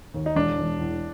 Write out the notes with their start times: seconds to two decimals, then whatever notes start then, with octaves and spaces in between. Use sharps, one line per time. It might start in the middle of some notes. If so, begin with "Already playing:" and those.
0.14 D#2
0.26 D#4
0.35 E1 D4
0.58 E1
0.80 E2